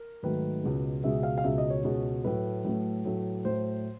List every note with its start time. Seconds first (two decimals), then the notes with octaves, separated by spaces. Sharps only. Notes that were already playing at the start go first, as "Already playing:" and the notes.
Already playing: A#4
0.23 G#2 D#3 F#3 A3 B4
0.64 C#2 B2 G#3
1.04 C#2 B2 G#3 E5
1.23 F5
1.38 F5
1.44 C#2 B2 G#3 E5
1.58 D#5
1.70 C#5
1.84 C#2 B2 G#3
2.24 A2 F#3 A3 B4
2.65 A2 F#3 A3
3.05 A2 F#3 A3
3.45 A2 F#3 A3 C5